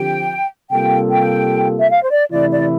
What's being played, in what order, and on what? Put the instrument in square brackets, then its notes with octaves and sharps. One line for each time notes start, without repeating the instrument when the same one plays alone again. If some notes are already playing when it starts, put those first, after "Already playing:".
Already playing: [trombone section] D3 F3 C4 G4 [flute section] G5
[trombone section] C3 G3 A#3 F4 A4 [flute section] G5
[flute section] G5
E5
F5
C5
D5
[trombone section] C3 E3 A3 E4 [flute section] D5
[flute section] D5